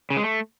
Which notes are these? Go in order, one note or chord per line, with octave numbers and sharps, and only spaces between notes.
C#3
G#3
A3